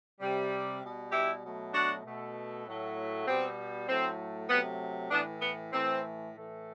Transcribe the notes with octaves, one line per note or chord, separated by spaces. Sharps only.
C3 G3
B2 G3
E4 G4
B2 F#3 A3
D4 F#4
B2 A3
A2 F#3 A3
B2 G3 C4
A2 F#3 A3 C4
C3 F#3 A3 B3
A2 E3 A3 B3 D4
B3
A2 E3 A3 C4
A2 E3 A3